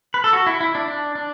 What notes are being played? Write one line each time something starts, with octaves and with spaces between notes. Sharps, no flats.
B4
A4
F#4
E4
E4
D4
D4
D4